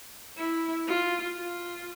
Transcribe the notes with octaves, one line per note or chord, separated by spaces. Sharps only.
E4
F4
F4